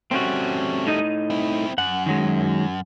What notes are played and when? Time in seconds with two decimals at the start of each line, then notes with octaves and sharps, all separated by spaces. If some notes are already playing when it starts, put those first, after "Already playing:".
0.11 G3 A3 C4 C#4 F#4
0.87 A2 D#4 D#5
1.30 C4 E4
1.78 F#2 F#5
2.06 D#3 F#3 G#3